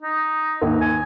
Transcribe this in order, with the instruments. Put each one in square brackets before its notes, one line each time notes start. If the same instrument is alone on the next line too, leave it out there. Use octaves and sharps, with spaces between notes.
[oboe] D#4
[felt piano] D#2
[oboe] G#5